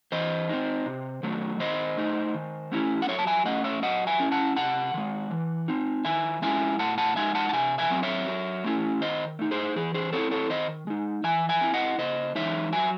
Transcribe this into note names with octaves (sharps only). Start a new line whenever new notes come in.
E3 C5 D#5
C4 D#4
C3
D#3 F#3 A3
D#3 C5 D#5
A3 D#4
D#3
A3 C#4 E4
F#5
F#3 C#5 E5
A5
E5 G#5
A3 C#4 D#5 F#5
C#5 E5
F#3 D#5 F#5
E5 G#5
C#4 E4
F#5 A5
C3 F#5 A5
D#3 G#3
E3
C4 D#4
D#3 E5 G#5
G#3 C#4 E4 E5 G#5
A2 F#5 A5
F#5 A5
G#3 D#4 E5 G#5
F#5 A5
A5
C3 E5 G#5
E5 G#5
F#3 C4
C#5 E5
F#3
A3 C#4 E4
D#3 C5 D#5
A3 D#4
G#4 C5
E3 G#4
G#4 C5
C4 E4 A4 C#5
A4 C#5
D#3 C5 D#5
G#3 D#4
E3 E5 G#5
E5 G#5
C4 E4
D#5 F#5
C#3 C5 D#5
E3 G#3 D#4 C#5 E5
F#3 E5 G#5